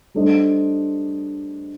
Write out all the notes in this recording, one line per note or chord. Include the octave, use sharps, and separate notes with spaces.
G3 D4 A4 C5 D#5